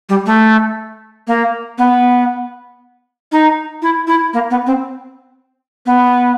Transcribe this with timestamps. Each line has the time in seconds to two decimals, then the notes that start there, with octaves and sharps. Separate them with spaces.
0.09 G3
0.26 A3
1.27 A#3
1.78 B3
3.32 D#4
3.82 E4
4.07 E4
4.33 A#3
4.50 B3
4.66 C4
5.86 B3